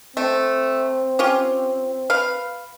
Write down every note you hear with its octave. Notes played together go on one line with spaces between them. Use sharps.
A3 C4
C#4 F4 G4
B4 F5